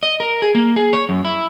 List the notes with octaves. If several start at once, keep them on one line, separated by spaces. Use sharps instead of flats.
D#5
A#4
G#4
A#3
G#4
C#5
F#2
E4